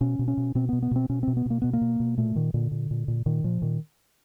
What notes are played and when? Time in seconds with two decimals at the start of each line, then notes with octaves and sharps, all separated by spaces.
0.01 B2 C#4
0.19 B2
0.28 C#4
0.37 B2
0.55 B2 C4
0.69 B2 B3
0.82 B3
0.91 B2 C4
1.09 B2 C#4
1.23 B2 C4
1.37 B3
1.46 B2 A#3
1.62 B2 B3
1.73 A#3
1.81 B2
2.00 B2
2.17 A#2 A3
2.35 A#2 D#3
2.54 A#2 D3
2.71 A#2
2.91 A#2
3.08 A#2
3.26 A#2 D#3
3.44 A#2 F3
3.62 A#2 D#3